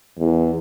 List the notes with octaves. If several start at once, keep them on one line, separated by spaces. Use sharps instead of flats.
E2